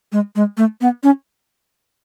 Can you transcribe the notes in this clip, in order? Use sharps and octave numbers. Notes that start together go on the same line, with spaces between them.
G#3
G#3
A3
B3
C#4